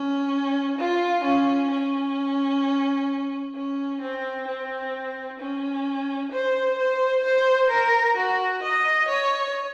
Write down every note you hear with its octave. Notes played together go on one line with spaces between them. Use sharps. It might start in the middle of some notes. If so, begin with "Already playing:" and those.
Already playing: C#4
F4
C#4
C#4
C#4
C4
C4
C#4
C5
C5
C5
A#4
F#4
D#5
C#5